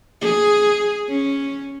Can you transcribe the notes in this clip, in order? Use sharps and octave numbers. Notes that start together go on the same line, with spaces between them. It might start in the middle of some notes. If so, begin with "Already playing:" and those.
G#4
C#4